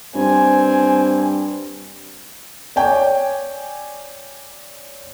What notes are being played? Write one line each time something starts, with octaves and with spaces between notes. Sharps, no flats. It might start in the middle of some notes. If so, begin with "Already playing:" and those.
G2 C4 G#5
C#5 D5 G5 G#5